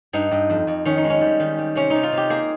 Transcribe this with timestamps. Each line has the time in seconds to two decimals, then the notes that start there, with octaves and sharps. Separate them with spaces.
0.13 G2 D#4
0.31 G2
0.50 F2
0.67 F2
0.85 D#3 C#4
0.98 D#4
1.04 G#3
1.10 C#4
1.21 G3
1.40 D#3
1.58 G3
1.75 C3 C#4
1.90 C3 D#4
2.03 F4
2.12 C3
2.17 G4
2.30 A#3 G#4